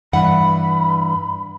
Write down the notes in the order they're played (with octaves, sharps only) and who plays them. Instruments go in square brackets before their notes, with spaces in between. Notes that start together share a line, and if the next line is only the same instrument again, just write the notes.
[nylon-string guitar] G2 E3 F#5 [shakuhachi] B5